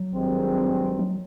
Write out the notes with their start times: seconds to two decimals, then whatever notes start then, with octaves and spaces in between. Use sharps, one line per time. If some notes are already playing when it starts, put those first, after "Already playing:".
Already playing: F#3
0.14 G#1 G2 D#3 G#3 C4
0.99 F#3